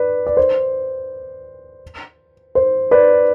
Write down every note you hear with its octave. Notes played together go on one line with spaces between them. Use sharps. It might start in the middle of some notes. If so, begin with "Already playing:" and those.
Already playing: B4 D5
D5
C5
C5
B4 D5